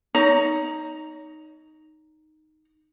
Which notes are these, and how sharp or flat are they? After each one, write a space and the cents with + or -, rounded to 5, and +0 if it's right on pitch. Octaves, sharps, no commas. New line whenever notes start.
D#4 +0 C#5 +30 A#5 +0